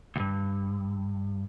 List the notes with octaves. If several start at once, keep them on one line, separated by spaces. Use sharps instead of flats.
C#2 G2